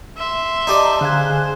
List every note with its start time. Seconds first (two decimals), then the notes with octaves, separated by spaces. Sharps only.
0.17 E5 C6
0.67 D#4 G4 D5 D#5 A5 A#5
1.01 D3 G#4 C5 F5 F#6 G#6